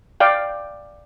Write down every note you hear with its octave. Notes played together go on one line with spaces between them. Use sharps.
D5 F5 G5